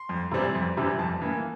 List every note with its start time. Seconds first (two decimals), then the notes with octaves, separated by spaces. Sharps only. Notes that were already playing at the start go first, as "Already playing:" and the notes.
Already playing: C6
0.09 F2
0.32 C3 E3 G3 C4
0.55 F2
0.77 C3 E3 G3 C4
0.99 F2 A5
1.22 E3 A#3